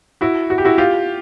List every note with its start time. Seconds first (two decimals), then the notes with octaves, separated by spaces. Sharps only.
0.21 E4 F#4
0.50 F#4
0.58 G4
0.65 E4 F#4
0.78 F4 G4